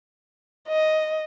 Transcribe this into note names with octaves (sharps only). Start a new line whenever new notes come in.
D#5